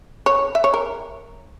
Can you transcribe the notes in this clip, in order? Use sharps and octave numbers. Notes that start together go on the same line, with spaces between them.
C#5
E5
C#5
A#4